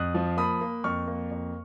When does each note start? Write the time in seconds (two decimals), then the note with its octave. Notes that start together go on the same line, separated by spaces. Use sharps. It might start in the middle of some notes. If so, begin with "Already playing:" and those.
Already playing: F2 D#6 F#6
0.14 F3
0.37 A#3 B5 D#6
0.61 A#3
0.84 F2 C#6 F6
1.07 A#3
1.31 F2